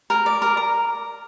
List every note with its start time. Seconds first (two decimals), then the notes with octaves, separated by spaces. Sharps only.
0.10 A#4
0.26 D5
0.42 A#4
0.57 A#5